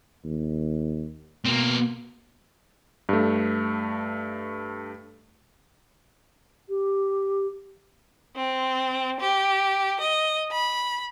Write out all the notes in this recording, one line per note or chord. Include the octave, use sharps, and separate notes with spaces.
D#2
B2 A#3 C4
G2 A3
G4
C4
G4
D#5
B5